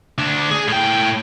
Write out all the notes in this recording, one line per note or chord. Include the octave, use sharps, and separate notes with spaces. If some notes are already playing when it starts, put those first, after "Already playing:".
D2 D4
G#4
A2 G5